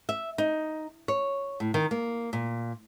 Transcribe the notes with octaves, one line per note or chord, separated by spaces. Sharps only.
E5
D#4
C#5
A2
D#3
A#3
A#2